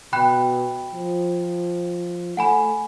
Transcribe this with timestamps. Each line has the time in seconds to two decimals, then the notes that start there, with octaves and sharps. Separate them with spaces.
0.13 B2 G5 B5 F#6
0.94 F3
2.37 A3 F#5 G#5 B5